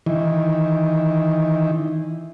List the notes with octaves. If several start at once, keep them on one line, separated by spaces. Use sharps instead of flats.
D#3 E3